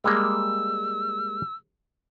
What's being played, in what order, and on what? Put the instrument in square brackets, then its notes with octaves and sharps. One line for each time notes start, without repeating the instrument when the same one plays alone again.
[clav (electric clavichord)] G3 G#3 A#3 [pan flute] E6